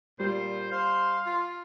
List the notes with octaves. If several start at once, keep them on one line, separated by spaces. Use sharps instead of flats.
A#2 G3 C5
C5 F5
F4